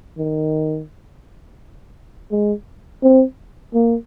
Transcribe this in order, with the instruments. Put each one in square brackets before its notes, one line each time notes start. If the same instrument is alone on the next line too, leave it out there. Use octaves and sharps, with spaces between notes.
[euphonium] D#3
G#3
C4
A#3